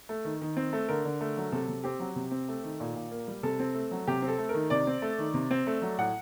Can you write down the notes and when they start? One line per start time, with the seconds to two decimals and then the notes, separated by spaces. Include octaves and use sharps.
0.09 A3
0.25 D#3
0.42 D#3
0.57 C4
0.73 A3
0.88 D3 A#4
1.05 D3
1.21 A3
1.37 F#3
1.52 C3 A4
1.69 C3
1.84 C4 G4
2.00 F#3
2.16 C3
2.31 C4
2.48 A3
2.64 D#3
2.80 A#2
2.96 A#2
3.11 A#3
3.28 G3
3.43 C3 A4
3.60 C4
3.75 A3
3.91 F#3
4.08 C3 G4
4.22 C4
4.28 A4
4.38 A3
4.49 A#4
4.54 D#3
4.70 C3 D5
4.87 C4
5.02 A3
5.19 D#3
5.34 C3
5.51 C4
5.67 A3
5.82 F#3
5.98 A2 F#5